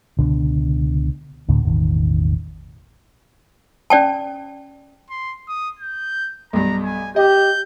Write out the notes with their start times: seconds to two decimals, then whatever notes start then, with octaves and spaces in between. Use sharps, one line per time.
0.19 C#2 B2 D3 D4
1.49 D2 A2 D3
1.63 E1 A1 D#3
3.90 C#4 D5 G5 A5
5.10 C6
5.48 D#6
5.79 G6
6.53 B1 G2 A#5
6.84 G#5
7.16 G4 D#5 G6